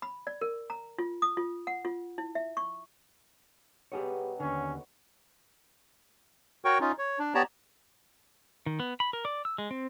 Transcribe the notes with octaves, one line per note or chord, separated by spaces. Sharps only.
B5
D5
A#4
A#5
F4
D#6
F4
F#5
F4
E4
E5
C#6
B2 F#3 G3 G4 G#4 C#5
D#2 D3 F#3 C#4 C#6
F#4 A#4 C#5 G5 C#6
C#4 D#4 F4
C#5
D4
B3 G4 C#5 D5 A5 A#5
D#3
B3
B5
A#4
D5
E6
G#3
C4